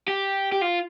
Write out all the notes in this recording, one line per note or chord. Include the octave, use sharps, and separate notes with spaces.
G4
G4
F4